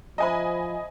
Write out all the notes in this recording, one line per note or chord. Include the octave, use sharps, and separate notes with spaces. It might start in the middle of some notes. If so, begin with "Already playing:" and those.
F3 C5 D#5 E5 G#5 A#5 B5